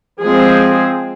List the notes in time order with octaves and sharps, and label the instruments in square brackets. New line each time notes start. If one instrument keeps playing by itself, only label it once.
[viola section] F3 G#3 C4 G#4